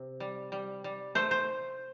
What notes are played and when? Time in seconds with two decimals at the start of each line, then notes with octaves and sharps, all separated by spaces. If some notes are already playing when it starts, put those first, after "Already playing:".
Already playing: C3
0.20 G3
0.52 G3
0.84 G3
1.15 A3 C5
1.31 C5